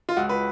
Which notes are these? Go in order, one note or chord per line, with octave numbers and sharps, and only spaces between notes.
F4
C#2 F#4
B4